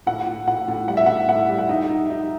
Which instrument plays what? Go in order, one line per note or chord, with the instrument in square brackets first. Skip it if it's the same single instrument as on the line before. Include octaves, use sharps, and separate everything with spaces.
[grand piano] A2 [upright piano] F#5
[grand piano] A2
[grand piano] A2 [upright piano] F#5
[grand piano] A2
[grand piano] G3 [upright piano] F#5
[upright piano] E5
[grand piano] A2 [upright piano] F#5
[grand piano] A2 [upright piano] F#5
[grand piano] G3
[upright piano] F#5
[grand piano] D#4 [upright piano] E5
[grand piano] D#4
D#4